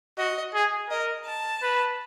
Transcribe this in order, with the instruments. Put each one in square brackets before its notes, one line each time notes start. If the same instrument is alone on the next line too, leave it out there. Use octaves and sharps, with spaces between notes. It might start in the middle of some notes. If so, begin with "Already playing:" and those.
[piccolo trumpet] F#4 [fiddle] D#5
[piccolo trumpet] G#4
[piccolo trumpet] A#4 [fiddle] D#5
[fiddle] A5
[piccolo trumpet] B4